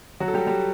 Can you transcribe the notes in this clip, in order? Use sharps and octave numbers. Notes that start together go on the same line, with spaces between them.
F#3 F#4
A4
G3 G4
G3 G4